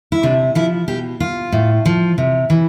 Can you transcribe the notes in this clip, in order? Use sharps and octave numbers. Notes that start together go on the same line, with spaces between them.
E4
C3 D4
F3 E4
B2 G4
F4
A2
F3
C3
E3